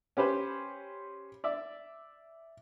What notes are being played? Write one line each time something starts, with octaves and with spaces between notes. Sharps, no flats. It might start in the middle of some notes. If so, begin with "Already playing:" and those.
C#4 G4 B4 C5
D5 E5